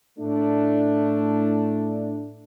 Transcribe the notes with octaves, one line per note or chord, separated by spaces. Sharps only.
A2 A3 D4